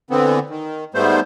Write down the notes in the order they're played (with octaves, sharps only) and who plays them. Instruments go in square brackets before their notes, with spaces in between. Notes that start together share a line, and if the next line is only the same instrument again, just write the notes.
[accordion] D3 E3 B3 C4
D#3
G#2 G3 A3 B3 C5